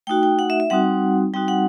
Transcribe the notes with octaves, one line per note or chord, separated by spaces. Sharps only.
A3 D#4 F#4 G5
G5
F#5
E5
E5
G3 C4 D#4 F#4 F#5
G3 C4 D#4 F#4 G5
F#5